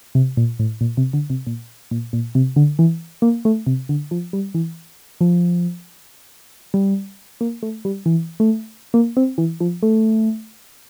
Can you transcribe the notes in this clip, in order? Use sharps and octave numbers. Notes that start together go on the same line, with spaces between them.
C3
A#2
A2
A#2
C3
D3
C3
A#2
A#2
A#2
C3
D3
E3
A#3
A3
C3
D3
F3
G3
E3
F3
G3
A#3
A3
G3
E3
A3
A#3
C4
E3
F3
A3